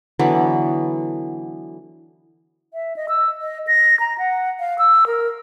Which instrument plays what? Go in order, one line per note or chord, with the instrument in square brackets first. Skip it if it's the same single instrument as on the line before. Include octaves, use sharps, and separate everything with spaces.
[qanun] D3 E3 F#3 B3
[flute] E5
D#5
E6
D#5
A#6
A#5
F#5
F5
E6
A#4